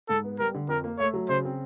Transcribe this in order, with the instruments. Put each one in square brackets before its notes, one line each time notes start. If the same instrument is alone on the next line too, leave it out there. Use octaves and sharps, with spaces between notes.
[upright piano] G#2 [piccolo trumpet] A4
[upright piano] B3
[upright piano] G3 [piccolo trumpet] A#4
[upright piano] D3
[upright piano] F2 [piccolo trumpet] A#4
[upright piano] A#3
[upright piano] A3 [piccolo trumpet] C#5
[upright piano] F#3
[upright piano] C#3 [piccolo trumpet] C5
[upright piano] C4